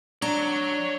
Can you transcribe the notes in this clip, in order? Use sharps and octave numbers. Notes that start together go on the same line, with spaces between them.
D4 C#5 A#5